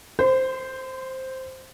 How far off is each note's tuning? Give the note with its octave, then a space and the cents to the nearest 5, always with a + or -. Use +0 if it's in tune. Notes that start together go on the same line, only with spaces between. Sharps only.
C5 +0 C6 -40